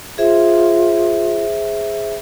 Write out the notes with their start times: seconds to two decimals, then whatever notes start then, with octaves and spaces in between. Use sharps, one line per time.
0.18 F4 G#4 C5 E5